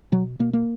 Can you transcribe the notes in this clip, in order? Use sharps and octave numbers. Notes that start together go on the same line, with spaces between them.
B2 F#3
B2 A#3
A#3